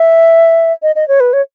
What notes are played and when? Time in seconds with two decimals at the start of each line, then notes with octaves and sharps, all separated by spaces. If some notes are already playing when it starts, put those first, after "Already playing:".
Already playing: E5
0.82 D#5
0.96 D#5
1.08 C#5
1.20 B4
1.33 C#5